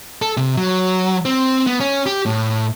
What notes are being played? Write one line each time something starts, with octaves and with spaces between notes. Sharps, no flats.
A4
C3
F#3
C4
B3
C#4
G4
A2